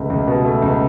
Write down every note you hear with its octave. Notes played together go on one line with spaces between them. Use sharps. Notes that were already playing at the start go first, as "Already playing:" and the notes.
Already playing: C#2 B2 A3
C#2
B2
A3
C#2